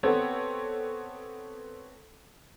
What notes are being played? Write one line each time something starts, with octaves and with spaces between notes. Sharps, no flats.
B3 C4 G4 A4 C#5